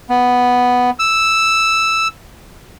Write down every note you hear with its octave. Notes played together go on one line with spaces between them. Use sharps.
B3
E6